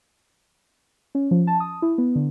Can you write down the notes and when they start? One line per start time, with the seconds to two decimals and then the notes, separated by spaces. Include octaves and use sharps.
1.15 C#4
1.31 F3
1.47 A5
1.60 D#6
1.82 E4
1.98 B3
2.16 D3